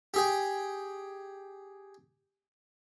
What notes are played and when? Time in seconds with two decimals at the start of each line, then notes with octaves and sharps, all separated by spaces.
0.14 G4 G#4 G5